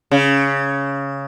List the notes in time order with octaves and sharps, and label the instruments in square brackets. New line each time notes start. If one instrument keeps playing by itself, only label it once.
[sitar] C#3